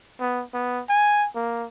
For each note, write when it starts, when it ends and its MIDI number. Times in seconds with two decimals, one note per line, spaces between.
0.20 0.43 59
0.54 0.82 59
0.89 1.28 80
1.35 1.66 58